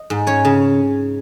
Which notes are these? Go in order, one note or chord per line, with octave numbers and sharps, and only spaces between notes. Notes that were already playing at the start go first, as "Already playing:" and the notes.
Already playing: D#5
G#2
C#4 C#5
C#3